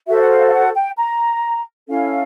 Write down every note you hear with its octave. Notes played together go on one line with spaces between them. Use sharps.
F#4 A4 C5 E5
F#5
F5
F5
F#5
G5
A#5
C#4 E4 A4 F5